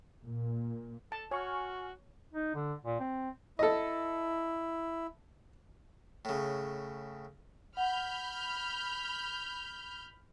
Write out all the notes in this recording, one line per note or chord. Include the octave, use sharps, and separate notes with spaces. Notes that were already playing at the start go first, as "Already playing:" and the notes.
A#2
A4 A5
F#4 C#5 G#5 C#6 F6
D#4
D3
A#2
C4
E4 A4 D#5
A2 C#3
F#5 B5 F6 G6